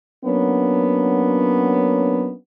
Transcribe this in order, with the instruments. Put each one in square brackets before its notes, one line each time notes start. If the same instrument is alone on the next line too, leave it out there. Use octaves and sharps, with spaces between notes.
[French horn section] F#3 A#3 B3 C#4 D4